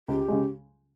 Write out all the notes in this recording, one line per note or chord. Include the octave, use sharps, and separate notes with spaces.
C#2 G4
C#3 G#3